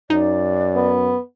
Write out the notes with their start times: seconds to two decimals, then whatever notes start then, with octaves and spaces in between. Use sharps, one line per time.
0.10 F#2 D#4 D5
0.75 B3